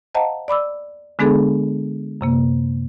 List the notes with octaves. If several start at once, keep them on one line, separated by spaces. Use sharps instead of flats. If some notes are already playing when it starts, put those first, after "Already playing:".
C5 D#5 F5 F#5 A5 A#5
D5 B5 D6 E6
D3 G#3 B3 D4 G#4 A4
F#2 C3 A#3